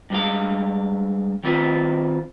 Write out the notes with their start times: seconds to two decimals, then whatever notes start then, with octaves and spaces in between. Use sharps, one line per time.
0.10 G2 G#3 F5
1.44 D#3 C4 F4 B4